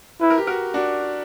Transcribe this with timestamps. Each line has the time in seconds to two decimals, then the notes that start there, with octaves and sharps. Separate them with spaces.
0.21 E4 B4
0.30 A#4
0.38 G4
0.47 F#4 A#4
0.74 D4 F#4